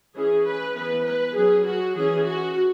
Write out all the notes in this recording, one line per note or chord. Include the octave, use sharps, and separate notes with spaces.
E3 C#4 G#4
B4
E3 B3 B4
B4
F#3 C#4 G#4
F#4
E3 C#4 G#4
F#4